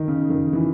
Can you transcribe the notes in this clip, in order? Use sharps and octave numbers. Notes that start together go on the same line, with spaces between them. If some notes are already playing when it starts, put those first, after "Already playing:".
Already playing: D#3
C#3
D#3
E3